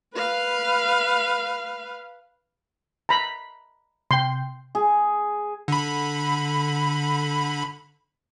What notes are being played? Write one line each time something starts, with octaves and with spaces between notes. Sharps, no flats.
B4 F5
A#5 B5
C3 G5 C6
G#4
D3 B5